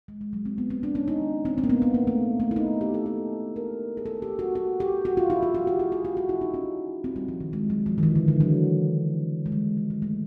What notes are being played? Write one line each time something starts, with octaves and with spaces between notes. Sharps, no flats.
G#3
G#3
F#3
C4
B3
C4
D4
C#4
D#4
C4
C4
A#3
B3
B3
A#3
A3
A3
E4
D#4
G4
A4
A4
A#4
G#4
A4
G4
F#4
F#4
G4
F#4
F4
E4
F4
F#4
G4
G#4
G#4
F#4
F#4
E4
D#4
C#4
C4
G3
F3
D#3
G#3
F#3
F3
D#3
E3
D3
D3
F#3
G#3
G3
G#3
G#3
A3